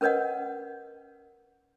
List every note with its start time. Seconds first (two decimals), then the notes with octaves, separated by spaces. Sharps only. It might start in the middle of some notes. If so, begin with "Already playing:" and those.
0.01 C#4 A#4 B4 C#5 D#5 F#5